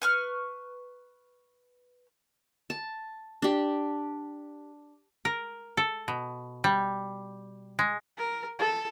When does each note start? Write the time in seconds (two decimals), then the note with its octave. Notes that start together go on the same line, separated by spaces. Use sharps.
0.02 B4 C#6 F6
2.70 A5
3.42 D4 G4
5.25 A#4
5.77 A4
6.08 B2
6.64 G3
7.79 G#3
8.17 A#4
8.59 A4